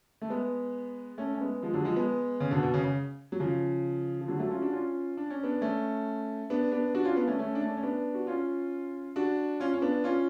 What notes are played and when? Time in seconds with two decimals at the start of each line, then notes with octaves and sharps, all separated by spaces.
0.22 A3
0.30 G#3 B3
1.18 A3 C#4
1.34 C#4
1.41 G#3 B3
1.62 F3 G#3
1.74 D3 F#3
1.84 F3 G#3
1.96 G#3 B3
2.40 C#3
2.51 B2 D3
2.63 B2
2.74 C#3
2.84 C#3
3.32 F#3
3.40 C#3 F3
4.21 F3
4.28 D3 F#3
4.39 F#3 A3
4.51 C#4 F4
4.61 D4 F#4
4.73 C#4 F4
5.17 D4
5.30 C#4
5.43 B3 D4
5.61 A3 C#4
6.50 B3 D4
6.72 B3 D4
6.95 D4 F#4
7.05 C#4 F4
7.16 B3 D4
7.27 A3 C#4
7.39 A3 C#4
7.55 D4
7.61 A3 C#4
7.77 C#4
7.83 B3 D4
8.14 F#4
8.27 C#4 F4
9.16 D4 F#4
9.60 C#4 F4
9.74 C#4
9.82 B3 D4
10.04 C#4 F4